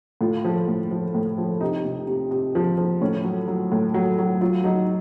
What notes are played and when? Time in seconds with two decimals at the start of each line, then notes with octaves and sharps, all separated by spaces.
0.21 A2 F4
0.44 F3
0.68 A2
0.91 F3
1.15 A2
1.38 F3
1.61 C3 D#4
1.85 C3
2.07 C3
2.31 C3
2.55 F3
2.77 F3
3.01 A2 C#4
3.24 F#3
3.47 F#3
3.72 A2
3.94 F#3
4.19 F#3
4.41 F#3 F4
4.64 F#3 D#4